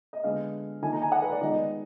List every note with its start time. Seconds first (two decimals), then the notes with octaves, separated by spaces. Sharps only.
0.13 D#5
0.24 D3 G#3 B3 F5
0.82 D#3 A#3 G#5
0.93 A#5
1.02 G#5
1.12 F#5
1.22 B4
1.32 D5
1.41 D#3 G#3 B3 D#5